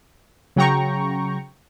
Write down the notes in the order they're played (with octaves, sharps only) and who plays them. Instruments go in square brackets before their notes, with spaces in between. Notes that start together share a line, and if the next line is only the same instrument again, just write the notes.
[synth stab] C#3 F#3 G5 A#5 C#6